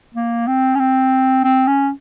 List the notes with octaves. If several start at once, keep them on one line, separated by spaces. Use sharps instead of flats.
A#3
C4
C#4
C4
C4
C#4